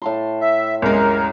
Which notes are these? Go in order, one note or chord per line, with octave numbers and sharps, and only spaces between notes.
A2 A5 C6
E5
C2 F#2 G#3 A#4